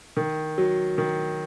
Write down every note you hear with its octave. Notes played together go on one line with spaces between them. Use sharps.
D#3
F#3
D#3